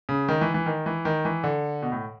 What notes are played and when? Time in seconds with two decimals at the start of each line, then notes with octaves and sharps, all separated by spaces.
0.09 C#3
0.28 D#3
0.41 E3
0.54 E3
0.66 D#3
0.86 E3
1.05 D#3
1.25 E3
1.44 D3
1.82 B2
1.92 A2